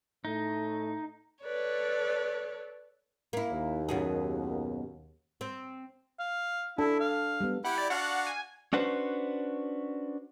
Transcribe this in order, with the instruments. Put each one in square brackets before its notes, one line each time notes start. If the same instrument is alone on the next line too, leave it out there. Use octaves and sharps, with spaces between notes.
[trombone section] A2 A3 [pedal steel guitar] D#4
[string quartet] A4 B4 C#5 D5
[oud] A#3 E4
[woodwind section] D#2
[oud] F#2 B2 G#4
C4
[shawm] F5
[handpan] D4 [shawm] E4 [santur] A4
[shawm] F5
[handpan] G3 B3
[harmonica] E4 G4 B5 [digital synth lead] F#5
[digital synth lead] D5
[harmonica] D4 F#4 F5 [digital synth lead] F#5
[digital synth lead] G#5
[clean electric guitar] C#4 D4 F#4 B4 C5